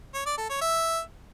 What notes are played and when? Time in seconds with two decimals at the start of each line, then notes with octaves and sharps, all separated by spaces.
0.14 C#5
0.26 D5
0.38 A4
0.50 C#5
0.61 E5